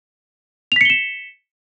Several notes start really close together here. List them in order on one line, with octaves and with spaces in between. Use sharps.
F7 B6 C#7 G7 E7